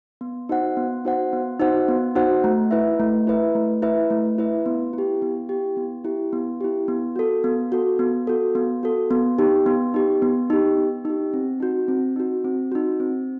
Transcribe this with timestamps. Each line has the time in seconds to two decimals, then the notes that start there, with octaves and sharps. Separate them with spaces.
0.21 B3
0.49 D#4 F#4 C5 F#5
0.77 B3
1.05 D#4 F#4 C5 F#5
1.33 B3
1.60 D#4 F#4 C5 F#5
1.88 B3
2.15 D#4 F#4 C5 F#5
2.44 A3
2.71 E4 B4 E5
3.00 A3
3.27 E4 B4 E5
3.55 A3
3.82 E4 B4 E5
4.10 A3
4.38 E4 B4 E5
4.66 B3
4.93 E4
4.98 G4
5.22 B3
5.49 E4 G4
5.77 B3
6.05 E4 G4
6.33 B3
6.61 E4 G4
6.88 B3
7.16 F#4 A4
7.44 B3
7.72 F#4 A4
7.99 B3
8.27 F#4 A4
8.55 B3
8.83 F#4 A4
9.11 B3
9.39 D#4 G4
9.66 B3
9.94 D#4 G4
10.22 B3
10.50 D#4 G4
10.77 B3
11.05 D#4 G4
11.34 C4
11.60 D#4 F#4
11.88 C4
12.16 D#4 F#4
12.45 C4
12.72 D#4 F#4
13.00 C4